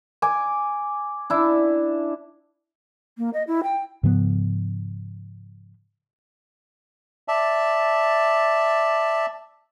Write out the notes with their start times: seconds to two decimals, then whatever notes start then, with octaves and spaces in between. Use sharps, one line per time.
0.22 G#5 D6
1.30 D4 E4
3.18 A#3
3.34 D#5
3.48 E4
3.63 G5
4.03 G#2 C#3 F3 B3
7.28 D5 E5 A5